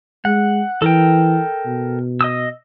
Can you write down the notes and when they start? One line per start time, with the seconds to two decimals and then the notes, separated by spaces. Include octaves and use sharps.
0.25 G#3 F#5
0.82 E3 A4 A#4 G5
1.66 B2
2.21 D#5 D#6 E6